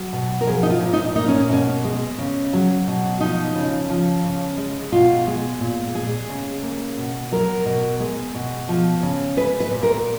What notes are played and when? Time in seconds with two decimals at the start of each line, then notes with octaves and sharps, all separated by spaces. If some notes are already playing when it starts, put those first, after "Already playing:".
Already playing: F#3
0.13 B2
0.41 A#4
0.47 F3 G#4
0.63 D#4
0.70 F4
0.81 A#2
0.93 D#4
1.16 A#3 D#4
1.28 C#4
1.50 B2 C#4
1.84 G#3
2.19 C#3
2.53 F#3
2.87 B2
3.21 F3 D#4
3.55 C#3
3.90 F3
4.24 C#3
4.57 G#3
4.92 B2 F4
5.27 G#3
5.61 A#2
5.94 G#3 G#4
6.29 C#3
6.63 A#3
6.97 B2
7.32 F#3 A#4
7.66 B2
8.00 G#3
8.35 B2
8.68 F3
9.03 C#3
9.37 G#3 B4
9.60 B4
9.71 A#2
9.83 A#4